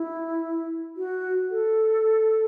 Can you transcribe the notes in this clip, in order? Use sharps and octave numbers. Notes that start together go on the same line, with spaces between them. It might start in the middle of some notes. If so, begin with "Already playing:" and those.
Already playing: E4
F#4
A4